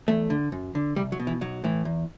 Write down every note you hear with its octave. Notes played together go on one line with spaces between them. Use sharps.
E2 A3
D3
F#2
D3
C2 G3
F#3
B2
E3
B1 F#3
A2 E3
E2